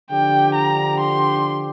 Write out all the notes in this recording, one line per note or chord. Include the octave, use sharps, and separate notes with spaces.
D3 F3 D4 G4 G5
A#5
C6